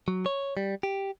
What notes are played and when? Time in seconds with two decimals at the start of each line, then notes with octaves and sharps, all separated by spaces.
0.08 F#3
0.26 C#5
0.57 G3
0.83 G4